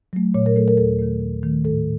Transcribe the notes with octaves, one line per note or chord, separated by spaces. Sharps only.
F#3 A3
A#2 C#5
A#4
F#3 A3 A4
A#4
D#2 A4
D#3 A3
D#2
D#3 A3
A2 A4